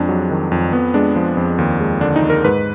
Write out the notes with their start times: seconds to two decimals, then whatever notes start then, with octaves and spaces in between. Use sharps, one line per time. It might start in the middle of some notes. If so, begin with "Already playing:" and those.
Already playing: F2 G#3 D4
0.09 F#3
0.31 D#3
0.52 F2
0.73 F2 B3
0.94 G#3 D4
1.16 F3
1.37 F2
1.58 D#2
1.80 G#3
2.01 D3 D4
2.16 D#4
2.22 D#2
2.30 A#4
2.44 G#2 B4